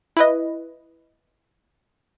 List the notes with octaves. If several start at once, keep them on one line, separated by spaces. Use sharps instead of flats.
E4 B4 D#5